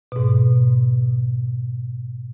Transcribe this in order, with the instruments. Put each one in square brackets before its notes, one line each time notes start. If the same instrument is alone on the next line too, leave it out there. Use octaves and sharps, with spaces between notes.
[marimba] G#2 B2